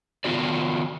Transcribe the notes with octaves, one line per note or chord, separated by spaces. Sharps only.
D#3 B3 F4 F#4 D5